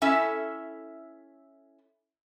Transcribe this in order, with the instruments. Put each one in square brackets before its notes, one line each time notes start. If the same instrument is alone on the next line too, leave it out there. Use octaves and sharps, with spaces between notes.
[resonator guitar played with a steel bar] C#4 E4 A4 E5